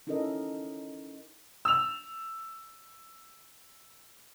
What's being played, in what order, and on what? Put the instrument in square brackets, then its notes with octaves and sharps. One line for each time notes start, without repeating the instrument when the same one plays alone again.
[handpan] C#4 D#4 E4 A4 A#4 D#5
[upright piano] E6 F7